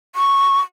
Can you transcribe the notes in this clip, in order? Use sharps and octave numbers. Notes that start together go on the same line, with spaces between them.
C#6